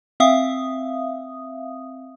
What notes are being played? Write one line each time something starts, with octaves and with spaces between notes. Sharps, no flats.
C4 E5 F5 D#6